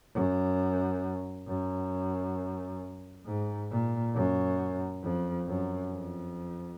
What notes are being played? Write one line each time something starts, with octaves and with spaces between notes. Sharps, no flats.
F#2
F#2
G#2
A#2
F#2
F2
F#2
F2